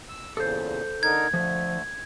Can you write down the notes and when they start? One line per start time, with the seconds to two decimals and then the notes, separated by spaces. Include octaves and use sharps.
0.09 E6
0.37 E2 A#2 C#3 A4 C5
1.03 D3 D#4 A#4 G#6
1.34 D3 F3 A3